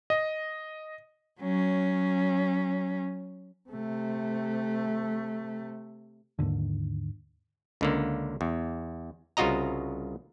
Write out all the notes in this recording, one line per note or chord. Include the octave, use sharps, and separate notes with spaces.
D#5
F#3 C#4
C3 A3
D#2 G#2 D3
C#2 D3 A#3
E2
C2 C#3 F4 F#4 D#5 A#5